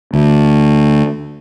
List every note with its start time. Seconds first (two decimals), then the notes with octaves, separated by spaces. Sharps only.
0.13 D2